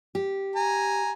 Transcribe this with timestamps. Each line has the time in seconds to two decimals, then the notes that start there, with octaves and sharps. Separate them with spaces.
0.15 G4
0.56 G#5 A#5